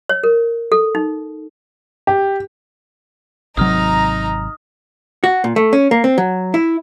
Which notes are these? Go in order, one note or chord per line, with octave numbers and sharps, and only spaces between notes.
C#5
A#4
A4
D#4
G4
G#1 C3 F#3 D#4 A#5 D#6 F6
F#4
A#2
A3
C#4
A#3
C4
F#3
E4